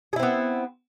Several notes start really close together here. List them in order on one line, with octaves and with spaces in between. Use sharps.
G#4 E4 C4 B3